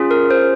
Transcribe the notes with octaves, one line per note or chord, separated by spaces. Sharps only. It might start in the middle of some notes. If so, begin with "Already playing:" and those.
Already playing: C#4 F4 G#4
A#4
C5